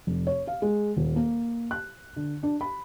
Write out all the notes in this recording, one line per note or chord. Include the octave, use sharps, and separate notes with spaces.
F1
C#5
F5
G#3
D#1
A#3
F#6
D3
D4
B5